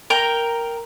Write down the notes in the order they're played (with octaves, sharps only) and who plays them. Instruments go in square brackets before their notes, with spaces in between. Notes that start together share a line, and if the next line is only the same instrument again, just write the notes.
[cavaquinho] A#4 G5 A#5